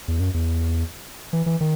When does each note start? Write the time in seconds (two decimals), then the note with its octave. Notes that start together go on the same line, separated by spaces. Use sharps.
0.08 E2
0.20 F#2
0.34 E2
1.33 E3
1.46 E3
1.61 D#3